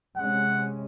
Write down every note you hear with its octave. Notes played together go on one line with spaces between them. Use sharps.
C3 G#3 C#4 F#5